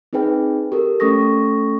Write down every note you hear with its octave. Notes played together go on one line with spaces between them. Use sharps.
C4 D#4 G#4 B4 G5
G4 A4 A#4
A3 C#4 A4 C#6 D#6 A#6